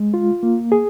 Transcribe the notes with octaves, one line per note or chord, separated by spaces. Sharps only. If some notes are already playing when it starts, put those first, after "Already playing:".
Already playing: G#3
F4
A#3
G#4